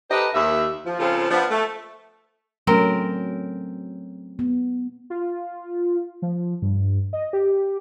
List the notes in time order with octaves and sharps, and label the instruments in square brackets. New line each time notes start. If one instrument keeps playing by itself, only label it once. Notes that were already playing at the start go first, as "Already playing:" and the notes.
[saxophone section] D#4 G4 A4 B4 C5 D#5
D#2 E5
F3
C#3 F3 G#3 C4 F4 A4
F3 B3 D4
A3
[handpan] F#3 A3 C#4 [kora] C4 A#4
[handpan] B3
[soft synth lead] F4
F3
G2
D#5
G4